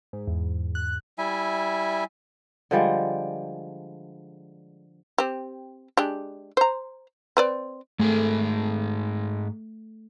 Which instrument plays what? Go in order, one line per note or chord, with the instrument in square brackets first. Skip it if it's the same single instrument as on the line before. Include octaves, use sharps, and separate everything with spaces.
[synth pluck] G#2
E2
F#6
[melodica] G3 E4 E5 G#5
[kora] D3 F3 G3 G#3
[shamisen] C4 G4
G#3 D4 G4
C5 A#5
C4 B4 D5
[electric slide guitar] G#2 G#4 A#4 [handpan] A3